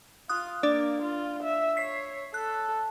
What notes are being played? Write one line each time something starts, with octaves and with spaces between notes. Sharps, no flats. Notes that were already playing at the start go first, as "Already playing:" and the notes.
F4 D#6 F#6
A#3 D4 D5
F4
E5
C#5 B6 C7
A4 F#6